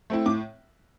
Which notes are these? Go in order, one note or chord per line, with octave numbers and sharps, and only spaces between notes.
A3 C4 E4
A2 D6